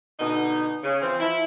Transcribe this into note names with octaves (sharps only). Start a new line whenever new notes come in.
B2 D3 D#4
C#3
E3 F3 C4
F3 E4